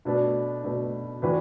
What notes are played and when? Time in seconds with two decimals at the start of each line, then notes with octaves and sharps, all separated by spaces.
0.05 B2 A3 D4 B4
0.64 B2 A3 D4 B4
1.22 A2 E3 D4 F#4 B4